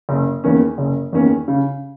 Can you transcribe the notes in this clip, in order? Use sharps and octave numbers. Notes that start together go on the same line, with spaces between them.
F#1
E2 D#3 A#3 C#4
F#1
E2 D#3 A#3 C#4
C#3